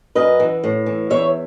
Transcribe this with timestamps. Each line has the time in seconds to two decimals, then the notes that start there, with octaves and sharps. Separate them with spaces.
0.15 F#2 B4 D#5
0.40 E3
0.64 A2
0.86 E3
1.10 E2 C#5 E5